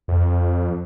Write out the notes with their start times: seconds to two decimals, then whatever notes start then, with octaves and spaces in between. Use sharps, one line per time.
0.08 F2